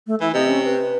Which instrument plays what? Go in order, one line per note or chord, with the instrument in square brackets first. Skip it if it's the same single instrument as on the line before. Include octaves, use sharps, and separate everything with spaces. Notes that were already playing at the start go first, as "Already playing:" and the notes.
[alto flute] A3
[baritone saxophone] E3 [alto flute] E4
[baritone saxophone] C3 [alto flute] D#5
[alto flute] C#4
B4